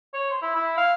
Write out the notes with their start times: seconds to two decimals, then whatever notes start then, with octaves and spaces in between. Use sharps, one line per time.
0.14 C#5
0.30 C5
0.42 E4
0.55 E4
0.77 F5